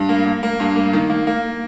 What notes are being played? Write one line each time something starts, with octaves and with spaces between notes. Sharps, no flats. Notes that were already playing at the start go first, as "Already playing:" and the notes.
Already playing: G2
A#3
A#3
A#3
G2
A#3
D#3
A#3
A#3